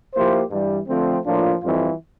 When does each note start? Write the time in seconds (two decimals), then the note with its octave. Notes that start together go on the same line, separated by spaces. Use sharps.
0.13 F3 A#3 E4 G4 C5
0.50 G2 E3 G3
0.86 D3 F3 A3 C4
1.23 A2 F3 A#3 D4 F4
1.61 F2 E3 G3 C4 F4